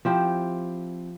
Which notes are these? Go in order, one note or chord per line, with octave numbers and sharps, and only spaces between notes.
F3 C4 E4 G4